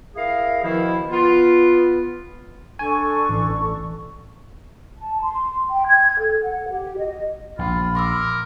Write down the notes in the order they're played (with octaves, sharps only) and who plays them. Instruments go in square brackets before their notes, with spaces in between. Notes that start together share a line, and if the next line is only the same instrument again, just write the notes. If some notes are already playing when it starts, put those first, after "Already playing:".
[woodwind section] E4 G#4 A#4 F5
B2 D#3 F3 E4
B3 F4
[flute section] D4 A4 C#6 [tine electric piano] G#5
[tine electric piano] A1
[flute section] A5
C6
G5
G#6
A4
F#5
G4
D#5
[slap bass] A#1 [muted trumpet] F4 [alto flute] B5
[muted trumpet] A#4 [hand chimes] C6 D6 E6